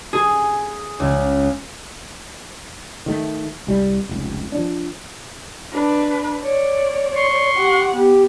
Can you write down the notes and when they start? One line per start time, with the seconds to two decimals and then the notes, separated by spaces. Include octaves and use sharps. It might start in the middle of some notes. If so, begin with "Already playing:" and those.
0.13 G#4
1.00 C#2
3.06 D#3 A3
3.67 C2 G3
4.09 F1 C#2
4.52 F3 D4
5.72 D4 B4
6.42 C#5 D5
7.15 C6 C#6
7.55 G4 F#5
7.94 B3 G4